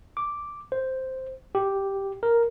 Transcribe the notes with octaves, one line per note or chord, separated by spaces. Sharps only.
D6
C5
G4
A#4